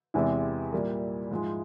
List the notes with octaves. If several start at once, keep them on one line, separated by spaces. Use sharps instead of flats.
E2 C3 E3 G#3 E4
A#2 G3 A#3
G#2 F3 G#3